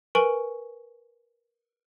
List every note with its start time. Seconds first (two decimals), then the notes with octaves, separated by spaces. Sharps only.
0.15 A#4 B4 G#5 C#6 D7 F#7